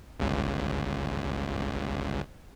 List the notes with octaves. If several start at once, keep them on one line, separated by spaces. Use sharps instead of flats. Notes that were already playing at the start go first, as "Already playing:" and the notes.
G1 C#2